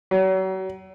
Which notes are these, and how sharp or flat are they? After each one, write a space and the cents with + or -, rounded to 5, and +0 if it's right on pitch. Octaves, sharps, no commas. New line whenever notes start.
F#3 +35